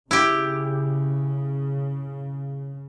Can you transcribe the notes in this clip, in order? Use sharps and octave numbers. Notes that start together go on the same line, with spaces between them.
C#3 E4 G4